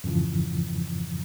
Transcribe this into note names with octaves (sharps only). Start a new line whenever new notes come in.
F2 G#2 C#3 E3 F3